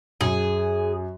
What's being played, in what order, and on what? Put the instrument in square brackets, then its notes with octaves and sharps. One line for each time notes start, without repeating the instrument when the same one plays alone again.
[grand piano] F#2 [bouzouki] G#4